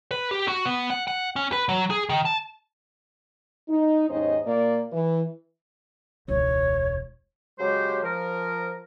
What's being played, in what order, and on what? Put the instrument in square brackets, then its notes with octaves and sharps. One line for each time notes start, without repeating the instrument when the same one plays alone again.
[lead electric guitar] B4
G4
F#4
B3
F#5
F#5
C#4
B4
F#3
G#4
D#3
A5
[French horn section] D#4
D#2 G#2 C#4 D#4 C5 D#5
A#2 A#3 D5
E3
[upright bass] E1 C#2 [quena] C#5
[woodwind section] C#3 F#3 G#3 G4 C5
F3 A#4